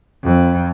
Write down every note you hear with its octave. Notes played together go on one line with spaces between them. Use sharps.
F2